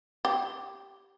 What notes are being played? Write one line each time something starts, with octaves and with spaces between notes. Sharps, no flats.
G4